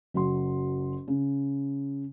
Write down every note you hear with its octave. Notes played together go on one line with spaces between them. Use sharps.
F#1 F#3 C6
C#3